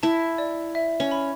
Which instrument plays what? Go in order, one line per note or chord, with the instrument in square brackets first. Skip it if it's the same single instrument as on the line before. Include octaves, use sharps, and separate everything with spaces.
[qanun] E4 [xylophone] A5
[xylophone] D5
E5
[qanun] C#4
[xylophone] B5